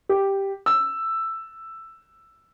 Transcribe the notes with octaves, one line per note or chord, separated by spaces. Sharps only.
G4
E6